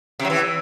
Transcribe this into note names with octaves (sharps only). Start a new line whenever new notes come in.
C3
F#3
E3